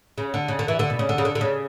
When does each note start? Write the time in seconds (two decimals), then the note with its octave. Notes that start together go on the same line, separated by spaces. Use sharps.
0.18 C#3
0.34 D3
0.48 C#3
0.59 D3
0.68 E3
0.79 D3
0.90 B2
0.99 C#3
1.09 D3
1.18 C#3
1.25 D3
1.35 D3
1.41 C#3